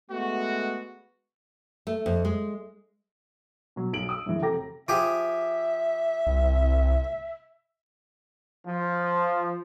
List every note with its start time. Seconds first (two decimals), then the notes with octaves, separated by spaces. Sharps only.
0.11 G#3 A3 B3 F#4
1.87 A3
2.06 F2
2.25 G#3
3.76 B2 F#3
3.93 B1 D7 F#7
4.09 D#6 E6
4.26 F#2 C#3 E3
4.42 F1 A4 G5 A#5 D6 A#6
4.88 F3 G4 G#4 E5
6.27 C2
8.67 F3